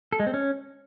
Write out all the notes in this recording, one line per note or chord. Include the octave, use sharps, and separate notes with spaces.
A4
G#3
C4
C#4